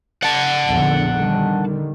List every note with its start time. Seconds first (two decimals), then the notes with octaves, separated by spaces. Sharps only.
0.22 F#5 A5
0.67 A#1 E2 D3
1.12 D3 D#3 G3